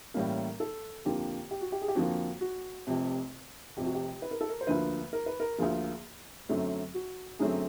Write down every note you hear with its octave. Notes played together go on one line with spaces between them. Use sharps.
A2 E3 G3 A#3 C#4 A#4
A4
F2 D3 F3 A#3 G4
G4
F#4
G4
G#4
G4
F2 D3 F3 A#3 F#4
F#4
F1 F2 C3
F1 F2 C3 G4
F#4
G4
B4
A#4
A4
A#4
C5
D2 D3 F3 A#3 B4
A#4
B4
A#4
D2 D3 F3 A#3 G#4
F#2 D3 F#3 A3 C4
F#4
F#2 D3 F#3 A3 C4 G#4